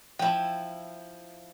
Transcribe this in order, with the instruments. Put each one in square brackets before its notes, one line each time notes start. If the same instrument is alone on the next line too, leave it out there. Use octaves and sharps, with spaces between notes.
[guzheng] F3 E4 [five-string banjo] G5